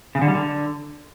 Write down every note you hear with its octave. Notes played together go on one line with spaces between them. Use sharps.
C#3
D3
G3
D3